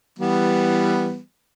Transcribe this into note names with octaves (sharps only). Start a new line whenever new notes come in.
E3 G3 B3